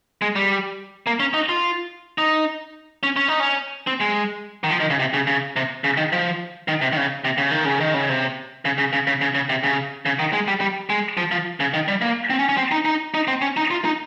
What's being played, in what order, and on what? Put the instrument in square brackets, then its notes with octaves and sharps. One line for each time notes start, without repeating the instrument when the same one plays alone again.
[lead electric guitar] G#3
G3
A#3
C#4
D#4
F4
D#4
C#4
C#4
D#4
C#4
C4
G#3
D#3
F3
D#3
C#3
C3
C#3
C#3
C3
C#3
D#3
F3
D#3
C3
D#3
C#3
C3
C#3
D#3
C#3
D#3
C#3
C3
C#3
C#3
C#3
C#3
C#3
C#3
C3
C#3
C#3
D#3
G#3
G3
G3
G#3
F3
F3
C#3
D#3
G3
A#3
C4
C#4
C#4
C4
D#4
D#4
D#4
C4
C#4
D#4
F4
D#4